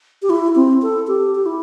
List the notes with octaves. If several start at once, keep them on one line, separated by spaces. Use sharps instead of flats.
G4
E4
C4
A4
G4
G4
E4